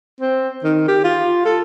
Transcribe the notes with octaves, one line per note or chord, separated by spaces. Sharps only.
C4
D#3
G4
F4
A4